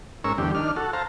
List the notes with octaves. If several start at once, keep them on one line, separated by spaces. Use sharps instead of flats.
G#2 C#4 A#4 C#6 E6
E2 G2 D3 G4
D#3 D4 F6
F#4 A4
C5 F5 A5 A#5